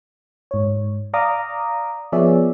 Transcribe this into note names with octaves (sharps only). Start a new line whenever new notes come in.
G#2 C#5
D5 F5 A#5 D6 D#6
F3 B3 G#4 C#5 D5 E5